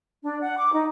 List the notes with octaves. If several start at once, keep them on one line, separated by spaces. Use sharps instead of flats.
D4
F#5
D6
D#4